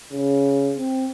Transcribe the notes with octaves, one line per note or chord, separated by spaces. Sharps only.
C#3
C4